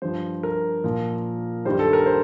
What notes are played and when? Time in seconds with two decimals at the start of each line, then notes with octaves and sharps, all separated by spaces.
0.02 G2 F3 C5
0.43 A#4
0.84 A#2 F3
1.65 G2 D#3 G3 C5
1.79 A4
1.93 A#4
2.06 C5